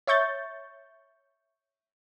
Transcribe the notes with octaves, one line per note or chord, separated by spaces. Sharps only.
C#5 E5 C#6 G6 A6